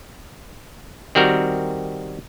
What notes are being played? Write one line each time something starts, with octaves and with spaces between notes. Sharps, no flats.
D#3 G3 C4 F#4 A#4